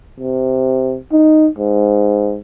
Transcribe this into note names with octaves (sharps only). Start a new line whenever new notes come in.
C3
D#4
G#2